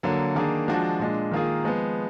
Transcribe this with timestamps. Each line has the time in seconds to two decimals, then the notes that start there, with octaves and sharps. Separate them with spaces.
0.03 D3 F#3 A#3
0.35 D#3 A#3 D4 G#4
0.68 F3 G#3 D4 F#4
0.99 A#2 G#3 D4
1.31 D#3 A#3 F4 G#4
1.64 F3 G#3 B3